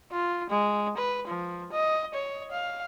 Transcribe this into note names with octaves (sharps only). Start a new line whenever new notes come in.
F4
G#3
B4
F3
D#5
C#5
F5